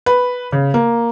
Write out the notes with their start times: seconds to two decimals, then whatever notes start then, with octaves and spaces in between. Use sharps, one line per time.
0.06 B4
0.52 C#3
0.74 A#3